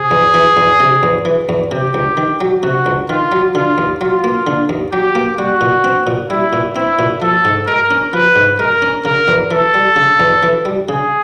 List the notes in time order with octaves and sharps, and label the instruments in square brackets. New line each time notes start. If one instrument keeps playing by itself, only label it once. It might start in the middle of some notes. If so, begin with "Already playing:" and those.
Already playing: [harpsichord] C3 [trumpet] G#4
[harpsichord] E2
E3
E2
C3
E2
E3
E2
[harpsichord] C3 [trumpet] G4
[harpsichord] C#2
D#3
F#3
[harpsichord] C3 [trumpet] F#4
[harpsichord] C#2
[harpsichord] D#3 [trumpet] F4
[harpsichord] F#3
[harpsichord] D3 [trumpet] F4
[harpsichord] D#2
[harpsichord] F#3 [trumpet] F4
[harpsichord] A#3
D3
D#2
[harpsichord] F#3 [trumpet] G4
[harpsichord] A#3
[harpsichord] G3 [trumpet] F#4
[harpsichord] A#2
C4
A#2
[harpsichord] G3 [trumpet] E4
[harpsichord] A#2
[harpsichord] C4 [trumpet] E4
[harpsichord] A#2
[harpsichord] F3 [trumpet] A4
[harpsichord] G#2
[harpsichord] G#3 [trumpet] A#4
[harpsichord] C#4
[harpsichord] F3 [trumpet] B4
[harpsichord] G#2
[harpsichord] G#3 [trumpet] A#4
[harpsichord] C#4
[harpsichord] C#3 [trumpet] A#4
[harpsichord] E2
[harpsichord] E3 [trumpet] A4
[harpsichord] G3
C#3
E2
E3
G3
[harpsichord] C#3 [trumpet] G#4